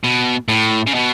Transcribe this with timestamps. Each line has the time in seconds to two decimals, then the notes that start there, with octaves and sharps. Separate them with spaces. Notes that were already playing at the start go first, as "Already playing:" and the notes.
0.04 B2
0.48 A2
0.87 C#3
0.95 B2